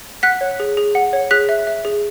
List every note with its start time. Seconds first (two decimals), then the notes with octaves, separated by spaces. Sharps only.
0.23 F#5 F#6 B6
0.41 C#5
0.60 G#4
0.77 G#4
0.95 F#5
1.13 C#5
1.31 G#4 F#6 B6
1.49 E5
1.67 E5
1.85 G#4